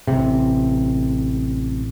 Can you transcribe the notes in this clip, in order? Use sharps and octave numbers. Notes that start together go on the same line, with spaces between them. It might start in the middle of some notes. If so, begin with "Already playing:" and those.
A1 C3